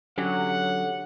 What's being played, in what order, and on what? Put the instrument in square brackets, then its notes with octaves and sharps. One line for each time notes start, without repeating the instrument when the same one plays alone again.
[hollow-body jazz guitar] D3 C#4 G4 [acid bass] F#3 [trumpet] F#5